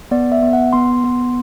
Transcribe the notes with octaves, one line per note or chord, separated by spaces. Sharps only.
B3 D5
E5
B3
F#5
B3 C6
B3